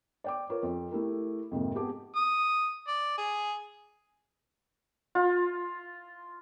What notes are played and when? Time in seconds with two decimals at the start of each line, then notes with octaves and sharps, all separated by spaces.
0.24 D5 G5 D6
0.50 F4 A#4 B4 C#5
0.63 F2
0.91 A3 E4 G4 A#4
1.51 F2 G#2 C3 A#3
1.75 B3 G4 G#4 A5 D6
2.16 D#6
2.88 D5
3.18 G#4
5.15 F4